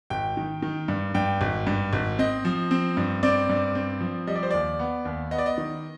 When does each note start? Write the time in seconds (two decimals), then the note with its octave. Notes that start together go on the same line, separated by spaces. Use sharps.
0.10 G#1 G5
0.37 D#3
0.62 D#3
0.88 G2
1.14 G2 G5
1.41 G#1
1.67 G2
1.93 G#1
2.19 C4 D#5
2.45 F3
2.71 C4
2.97 G2
3.23 C4 D5
3.49 G2
3.75 C4
4.01 F3
4.27 G3 D#5
4.35 D5
4.43 C5
4.51 D#2 D5
4.79 B3
5.05 D#2
5.31 B3 D#5
5.38 D5
5.46 D#5
5.58 D#3